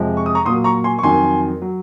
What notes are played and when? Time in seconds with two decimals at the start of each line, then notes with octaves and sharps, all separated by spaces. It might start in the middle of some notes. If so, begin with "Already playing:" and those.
Already playing: F2 C3 F3 G#3
0.17 C#6
0.26 D#6
0.35 A#5 C#6
0.45 A#2 C6 D#6
0.50 F#3
0.64 A#5 C#6
0.84 G#5 C6
0.99 C#6
1.03 F2 D#3 F#3 G#5 C6
1.62 F#3